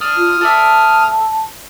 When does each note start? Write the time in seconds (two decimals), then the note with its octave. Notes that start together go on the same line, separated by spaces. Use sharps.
0.01 D4 D#6 F6
0.16 F4
0.41 A4 D5 E5 A5